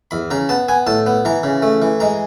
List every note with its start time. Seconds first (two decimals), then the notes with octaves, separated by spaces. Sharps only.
0.11 E2 B5
0.31 C#3 A#5
0.49 B3 A5
0.68 B3 G#5
0.87 A2 A5
1.06 B3
1.25 E3 A#5
1.43 C#3
1.62 A3
1.82 E3
2.00 G#3 A#5